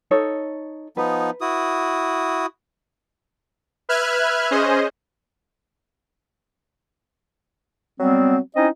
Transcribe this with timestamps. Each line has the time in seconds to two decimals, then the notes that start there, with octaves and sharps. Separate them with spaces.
0.11 D#4 A4 C#5
0.97 F3 B3 D#4 B4
1.41 E4 F#4 D#6
3.89 B4 E5 F6 F#6 G#6
4.51 C#4 G#4 C5 D#5
7.99 F#3 G3 B3 C4
8.55 C4 C#4 D#4 E4 D#5